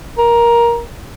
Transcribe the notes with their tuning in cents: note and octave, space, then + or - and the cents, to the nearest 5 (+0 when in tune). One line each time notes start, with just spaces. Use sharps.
A#4 +15